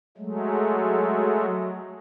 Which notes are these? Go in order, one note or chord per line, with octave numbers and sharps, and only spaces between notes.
F#3 G#3 A3